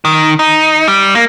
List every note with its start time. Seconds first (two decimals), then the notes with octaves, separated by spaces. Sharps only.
0.05 D#3
0.39 D#4
0.88 G3
1.15 A#3